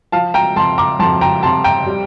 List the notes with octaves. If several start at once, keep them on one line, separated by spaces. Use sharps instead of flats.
F3 F5 A5
G5 A#5
F2 A5 C6
A#5 D6
F2 A5 C6
G5 A#5
C3 A5 C6
G5 A#5
G3